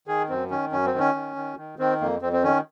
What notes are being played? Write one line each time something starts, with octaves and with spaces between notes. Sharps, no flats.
D#3 G#4
F#2 C4
D#3 C#4
F#2 C#4
C4
D#3
C#4
D#3
D#3
D#3
D#3 C4
F2 A#3
F2 C4
C4
D#3 C#4